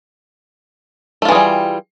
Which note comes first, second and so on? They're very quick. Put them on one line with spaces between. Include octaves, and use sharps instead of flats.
A3 F4 E3 G#4 G3